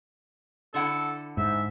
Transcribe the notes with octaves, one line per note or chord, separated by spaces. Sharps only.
D3 E4 A4 F#5
G#2 E5